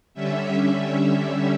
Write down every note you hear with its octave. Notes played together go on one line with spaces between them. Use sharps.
D3 G3 C#4 E5